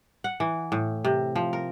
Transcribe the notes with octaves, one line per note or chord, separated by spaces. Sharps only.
F#5
E3
A2
C3
F3
A#4